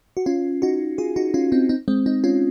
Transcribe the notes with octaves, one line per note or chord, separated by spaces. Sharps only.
F#4
C#4 F4
D#4 F#4
F4 G#4
D#4 F#4
C#4 F4
C4 D#4
C4 D#4
G#3 C4
C4 D#4
C#4 F4